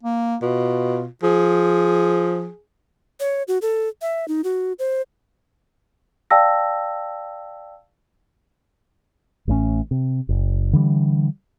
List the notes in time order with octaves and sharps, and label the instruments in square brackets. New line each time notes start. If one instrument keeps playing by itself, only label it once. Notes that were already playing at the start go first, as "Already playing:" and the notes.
[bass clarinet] A#3
[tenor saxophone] B2 [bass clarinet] F4
[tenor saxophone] F3 [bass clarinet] G#4
[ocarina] C#5
F#4
A4
E5
D#4
F#4
C5
[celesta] D5 F5 G5 A5 E6 A#6
[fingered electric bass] A1 A2 C#3 C#4
C3
F#1
D3 E3 G3